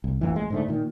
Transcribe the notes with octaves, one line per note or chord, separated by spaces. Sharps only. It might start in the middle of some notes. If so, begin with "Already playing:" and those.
C2
A1 F2 E3
A1 G#3
G#2 D3 A3
A#2 D#3